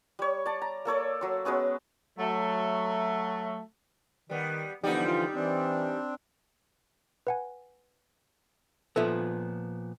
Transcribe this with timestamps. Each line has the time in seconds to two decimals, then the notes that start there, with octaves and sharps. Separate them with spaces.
0.19 G3 C#5
0.46 D5 A5
0.62 A#5
0.85 A#3 A4 C#5 D5
1.21 F#3 C6
1.45 F#3 G#3 B3 C#4
2.19 F#3 A3
4.30 D#3 G3 B3
4.84 D3 E3 F3 G3 B3 D#4 G4
5.06 F4
5.34 E3 C4 D4
7.27 B4 F#5 G#5
8.96 A#2 F3 B3 A4 E5